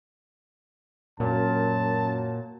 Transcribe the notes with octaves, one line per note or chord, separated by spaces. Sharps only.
F#2 A#2 F#3 A5